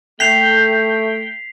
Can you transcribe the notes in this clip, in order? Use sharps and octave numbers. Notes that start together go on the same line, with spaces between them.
A3 G5 B6 C7 F7